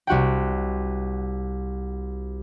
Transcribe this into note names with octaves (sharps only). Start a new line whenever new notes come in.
C2 F#4 F#5 G5